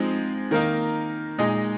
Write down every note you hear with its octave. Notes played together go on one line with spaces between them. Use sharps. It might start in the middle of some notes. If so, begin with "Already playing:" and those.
Already playing: F3 G#3 C4 D#4
D#3 A#3 D#4 A#4
A#2 G#3 D#4 D#5